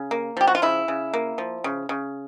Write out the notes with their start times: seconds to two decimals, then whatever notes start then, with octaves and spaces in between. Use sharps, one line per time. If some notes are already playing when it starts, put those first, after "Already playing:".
Already playing: C#3
0.11 A#3
0.37 F3 G4
0.47 F#4
0.55 F4
0.62 C#3 E4
0.88 C#3
1.13 A#3
1.38 F3
1.64 C#3
1.89 C#3